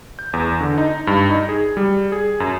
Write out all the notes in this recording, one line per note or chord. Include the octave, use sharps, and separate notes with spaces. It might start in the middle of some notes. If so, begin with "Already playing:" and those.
G6
E2
D3
D#4
G2
D#4
G#4
G3
G#4
F#2